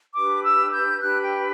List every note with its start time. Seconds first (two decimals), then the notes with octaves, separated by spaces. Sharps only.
0.14 D4 G4 B4 D6
0.43 E6
0.72 G6
1.00 D4 G4 B4 F#6
1.21 G5